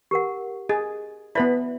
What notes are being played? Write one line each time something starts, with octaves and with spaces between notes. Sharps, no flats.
G4 A#4 F#5
G#4 D#5
B3 E4 B4 D5 E5 B5